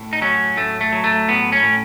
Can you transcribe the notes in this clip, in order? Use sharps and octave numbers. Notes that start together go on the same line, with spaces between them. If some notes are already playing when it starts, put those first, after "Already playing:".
Already playing: A2
D#4
F#3 C#4
A2 A3
A3
F#3
A3
A2 B3
C#4
A2